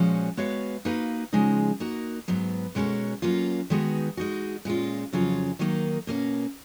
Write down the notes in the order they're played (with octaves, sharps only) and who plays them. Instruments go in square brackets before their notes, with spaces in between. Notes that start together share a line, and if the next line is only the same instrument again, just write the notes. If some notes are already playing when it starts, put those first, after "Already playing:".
Already playing: [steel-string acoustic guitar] A#2 F3 G#3 C#4 F#4
G#3 B3 F#4 C#5 F5
A#3 D#4 F#4 B4 F5
C#3 F3 G#3 D#4
A#3 D#4 F#4
G#2 F#3 B3
B2 G#3 C#4 F#4 A#4
F#3 A#3 C#4 F4
D#3 G#3 B3 D#4 F#4
G#3 D#4 F#4
A#2 G#3 C#4 F4
F2 C#3 F#3 C#4 F4
D#3 F#3 A#3 D#4
B2 A#3 C#4